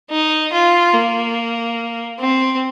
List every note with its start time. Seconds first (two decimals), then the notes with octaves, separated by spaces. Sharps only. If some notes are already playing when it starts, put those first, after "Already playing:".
0.10 D#4
0.53 F4
0.94 A#3
2.19 C4